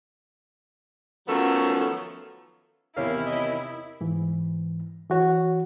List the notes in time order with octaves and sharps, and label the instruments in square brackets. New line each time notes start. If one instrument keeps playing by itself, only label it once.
[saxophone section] D#3 F3 F#3 A3 B3 C#4
[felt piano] E2 C3 D#3 [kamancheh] E4 [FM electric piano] A#4 C#5 [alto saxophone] F5
[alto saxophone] D#5
[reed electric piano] G#2 E3
E3 F#4 C#5